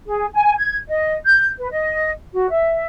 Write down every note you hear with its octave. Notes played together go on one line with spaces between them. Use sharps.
G#4
G#5
G#6
D#5
G6
B4
D#5
F#4
E5